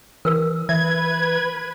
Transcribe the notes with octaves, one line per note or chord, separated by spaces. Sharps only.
E3 A#4 B4 E6
E3 B4 E5 G#6